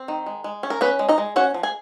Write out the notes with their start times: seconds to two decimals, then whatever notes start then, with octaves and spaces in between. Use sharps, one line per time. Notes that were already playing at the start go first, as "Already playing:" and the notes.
Already playing: C4
0.08 D#3
0.26 G#3
0.44 G#3
0.63 C#4
0.70 A#4
0.81 B3 C#4 B4
0.99 G#3
1.09 D#4 D#5
1.18 G#3
1.36 C#4 F#4 F#5
1.54 F3
1.63 G#4 G#5